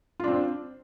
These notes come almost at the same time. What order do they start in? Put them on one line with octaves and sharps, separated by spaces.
F4 D4 C4